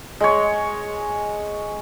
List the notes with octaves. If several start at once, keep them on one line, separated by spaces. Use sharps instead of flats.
G#3 C#5